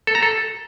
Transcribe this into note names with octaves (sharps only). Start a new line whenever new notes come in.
A4
A#5
A4